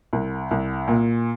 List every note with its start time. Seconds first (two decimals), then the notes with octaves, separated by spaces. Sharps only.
0.13 C2
0.51 C2
0.88 A#2